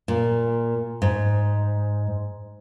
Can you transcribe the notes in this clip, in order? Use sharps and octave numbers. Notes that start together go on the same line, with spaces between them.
A#2
G#2